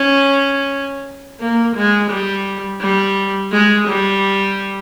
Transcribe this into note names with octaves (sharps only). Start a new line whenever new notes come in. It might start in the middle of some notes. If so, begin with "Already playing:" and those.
Already playing: C#4
A#3
G#3
G3
G3
G#3
G3